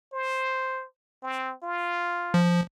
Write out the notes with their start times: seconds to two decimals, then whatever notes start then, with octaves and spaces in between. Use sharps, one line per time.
0.13 C5
1.22 C4
1.63 F4
2.34 F3